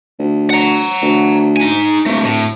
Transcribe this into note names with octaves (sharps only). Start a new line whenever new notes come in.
D2
F#5 A#5
D2
D#4 G#5
D1 A3 A#3
A2